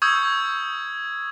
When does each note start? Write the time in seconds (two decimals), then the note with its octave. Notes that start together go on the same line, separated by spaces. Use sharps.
0.02 C#6 D#6 E6 G6 G#6